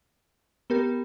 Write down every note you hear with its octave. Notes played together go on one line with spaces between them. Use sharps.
B3 G4 A#4